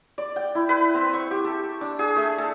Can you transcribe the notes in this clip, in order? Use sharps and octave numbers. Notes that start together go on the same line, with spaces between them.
D5
G5
E4
B4
C4
C#6
G4
A4
D4
G#4
A3
A4